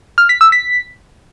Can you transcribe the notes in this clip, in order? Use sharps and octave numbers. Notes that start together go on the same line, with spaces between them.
F6
B6
E6
B6